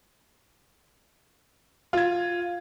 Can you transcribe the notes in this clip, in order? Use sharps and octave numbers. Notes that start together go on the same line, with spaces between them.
F4 G#6